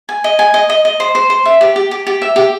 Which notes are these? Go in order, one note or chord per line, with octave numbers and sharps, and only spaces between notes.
G#5
D#5
G#5
D#5
D#5
D#5
C5
C5
C5
E5
G4
G4
G4
G4
E5
G4